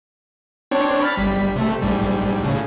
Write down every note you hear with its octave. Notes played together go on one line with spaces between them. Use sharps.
C4 D4 C#5
B5 F6 A6
G1 G3 B6
C3 A3
A#1 G#2 G3
A2 C#3